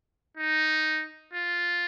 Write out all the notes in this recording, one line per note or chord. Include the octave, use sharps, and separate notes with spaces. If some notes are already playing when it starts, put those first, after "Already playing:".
D#4
F4